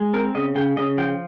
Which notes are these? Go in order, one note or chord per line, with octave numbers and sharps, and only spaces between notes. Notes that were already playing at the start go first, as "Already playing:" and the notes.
Already playing: G#3
C4 A#4
C#3 D#5
C#3 G5
C#3 D#5
F3 G5